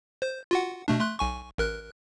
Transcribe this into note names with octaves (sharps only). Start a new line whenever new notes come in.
C5 G6
F4 F#4 F#5
B2 A3 D4
A3 C6 F#6
B1 G#5 C#6
A1 A#4 F#6